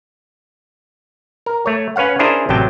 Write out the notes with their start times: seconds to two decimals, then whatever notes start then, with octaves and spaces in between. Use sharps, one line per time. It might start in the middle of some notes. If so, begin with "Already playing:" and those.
1.46 A#4
1.66 A3 C#5
1.96 C#4 B4 C#5 F5 F#5
2.19 C#4 D4 E4 G#4 A#4 C5
2.49 A1 C3 F#3 G5 A5